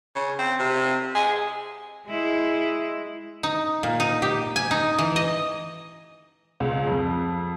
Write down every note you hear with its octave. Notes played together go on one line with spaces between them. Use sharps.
C#3
C4
C3
G#4
G#3 E4
D#4
A#2
D#4
G4
G#5
D#4
E3
D#5
C#2
F2